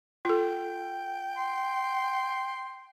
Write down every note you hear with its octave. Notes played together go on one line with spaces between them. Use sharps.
F4 A4 G5
C6